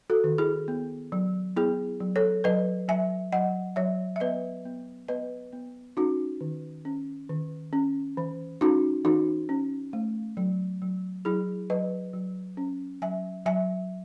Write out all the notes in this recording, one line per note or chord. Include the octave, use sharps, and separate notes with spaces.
F#4 A4
D#3
E4 G#4
B3
F#3
B3 E4 G#4
F#3
A4 C#5
F#3 B4 D#5
F#3 E5 G#5
F#3 D#5 F#5
F#3 C#5 E5
E5
B3 B4 D#5
B3
B3 B4 D#5
B3
C#4 D#4 F#4
D#3
C#4
D#3
C#4
E3
C#4 D#4 F#4
E3 D#4 F#4
C#4
A3
F#3
F#3
F#3 E4 G#4
F#3 B4 D#5
F#3
C#4
F#3 E5 G#5
F#3 E5 G#5